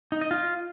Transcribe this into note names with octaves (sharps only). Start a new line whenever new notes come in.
D#4
D#5
F4